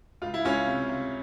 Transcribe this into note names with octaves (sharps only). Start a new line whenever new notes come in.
C#2 F4
E4
C#2 C#4 F4
C3
C3